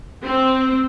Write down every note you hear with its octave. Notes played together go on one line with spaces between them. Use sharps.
C4